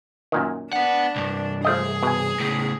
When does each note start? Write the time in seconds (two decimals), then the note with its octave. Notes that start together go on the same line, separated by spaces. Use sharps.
0.32 F#2 A#2 D#3
0.73 B3 D4 F#5
1.16 C2 G2
1.65 F3 A3 G#4 D#5
2.03 B2 G#5
2.40 A2 C#3